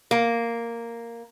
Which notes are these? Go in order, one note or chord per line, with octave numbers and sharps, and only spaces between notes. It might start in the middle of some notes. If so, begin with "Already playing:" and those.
A#3